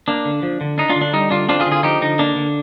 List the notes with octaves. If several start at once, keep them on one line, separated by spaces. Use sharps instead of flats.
A#3 D4
D3
F3
D3
D4 D#4
D4 F4
D3
D4
G3 D#4
D3 D4 F4
C4 D4 F4
F4 G#4
D3
F4 G#4
F3 D#4 G4
D3 D#4
A#3 D4
D3